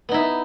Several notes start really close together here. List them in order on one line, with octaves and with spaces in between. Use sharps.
B3 D#4 E4